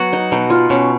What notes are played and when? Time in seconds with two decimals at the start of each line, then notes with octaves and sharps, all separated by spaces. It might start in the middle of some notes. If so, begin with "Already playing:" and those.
Already playing: F#3 B3 F#4
0.13 D#4
0.32 B2 D#4
0.50 F4
0.70 B2 C#4